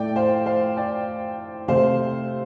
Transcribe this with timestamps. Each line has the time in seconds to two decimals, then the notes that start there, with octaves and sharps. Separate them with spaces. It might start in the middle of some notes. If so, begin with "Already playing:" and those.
Already playing: A2 A3 D5 G5
0.16 C5 F5
0.46 C5 F5
0.77 D5 G5
1.68 C3 A3 C5 F5